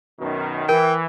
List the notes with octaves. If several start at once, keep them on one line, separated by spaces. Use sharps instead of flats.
F#2 B2 D#3
E3 A#4 G5